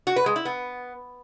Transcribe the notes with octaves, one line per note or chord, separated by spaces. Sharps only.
F#4
B4
G#3
E4
B3